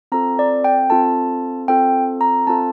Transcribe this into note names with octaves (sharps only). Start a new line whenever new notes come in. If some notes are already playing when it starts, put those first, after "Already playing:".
C4 F4 A4 A#5
D5
G5
C4 F4 A4 A5
C4 F4 A4 G5
A#5
C4 F4 A4 A5